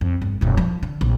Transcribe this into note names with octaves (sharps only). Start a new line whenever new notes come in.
F2
G1
D#1 F#2
F3
D3
A#1